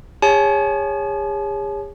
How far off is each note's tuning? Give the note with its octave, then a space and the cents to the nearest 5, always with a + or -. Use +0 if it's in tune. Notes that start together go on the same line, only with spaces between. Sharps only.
G#4 -40 C#5 +0 A5 -45